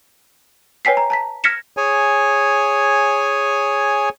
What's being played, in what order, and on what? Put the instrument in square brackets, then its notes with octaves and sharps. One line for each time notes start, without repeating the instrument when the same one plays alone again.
[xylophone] B4 C#5 G5 G#5 B6 C7
A#5
A5 A#5 B6
F6 G#6 A#6 B6 C#7 E7
[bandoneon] G#4 C#5 G#5